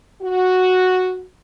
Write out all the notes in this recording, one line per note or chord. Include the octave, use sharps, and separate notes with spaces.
F#4